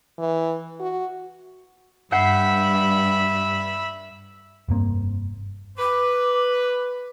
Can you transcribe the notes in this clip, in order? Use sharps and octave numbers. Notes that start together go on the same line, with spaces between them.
E3
F#4
G2 E5 F#5 B5 G6 C7
F1 G2 A#3 C4
B4 D6